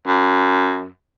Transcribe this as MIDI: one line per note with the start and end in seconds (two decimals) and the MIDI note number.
0.07 0.89 42